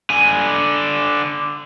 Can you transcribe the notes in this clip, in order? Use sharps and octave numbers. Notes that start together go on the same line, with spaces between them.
D3 G#5